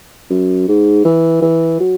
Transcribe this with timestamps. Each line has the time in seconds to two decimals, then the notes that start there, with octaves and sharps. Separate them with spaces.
0.30 F#2
0.68 G#2
1.05 E3
1.42 E3
1.80 F#3